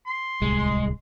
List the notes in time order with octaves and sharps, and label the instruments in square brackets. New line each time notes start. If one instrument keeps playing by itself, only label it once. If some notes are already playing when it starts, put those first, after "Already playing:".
[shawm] C6
[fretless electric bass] D1 C2 [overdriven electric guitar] G#3